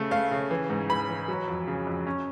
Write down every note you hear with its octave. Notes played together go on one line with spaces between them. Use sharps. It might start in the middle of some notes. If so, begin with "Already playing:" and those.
Already playing: C#3 A3
A3 F5
C#3
E3
G#2
E3 B5
E3
F#3
F2
C#3
F2
C#4